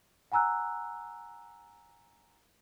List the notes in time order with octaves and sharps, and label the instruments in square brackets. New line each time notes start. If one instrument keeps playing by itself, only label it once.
[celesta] F#5 G#5 A#5 E6 F#6